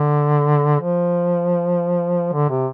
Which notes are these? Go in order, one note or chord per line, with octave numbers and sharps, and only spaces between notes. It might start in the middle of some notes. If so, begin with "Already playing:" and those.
Already playing: D3
F3
D3
C3